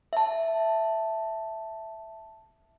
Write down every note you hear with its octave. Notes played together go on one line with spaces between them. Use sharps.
E5 A5